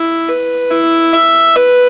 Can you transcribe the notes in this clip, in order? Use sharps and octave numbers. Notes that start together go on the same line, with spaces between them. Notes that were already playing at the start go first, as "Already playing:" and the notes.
Already playing: E4
B4
E4
E5
B4